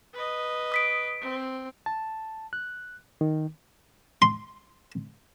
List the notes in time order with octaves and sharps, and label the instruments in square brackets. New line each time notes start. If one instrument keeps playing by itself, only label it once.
[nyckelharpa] B4 D#5
[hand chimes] D#6 B6 D7
[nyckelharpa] C4
[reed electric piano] A5
F#6
D#3
[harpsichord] C6